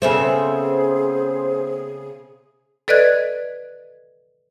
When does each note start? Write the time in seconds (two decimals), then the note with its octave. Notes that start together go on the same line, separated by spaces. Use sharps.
0.02 C#3 A3 B3 C4 G#4 C5 E5
2.88 A4 B4 D5 D#5 F#6 G#6